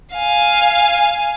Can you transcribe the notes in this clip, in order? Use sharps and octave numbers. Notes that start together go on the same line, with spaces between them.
F5 G#5